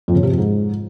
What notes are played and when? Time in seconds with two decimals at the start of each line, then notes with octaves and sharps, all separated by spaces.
0.08 F2
0.15 C#3
0.23 C3
0.30 F2
0.38 G#2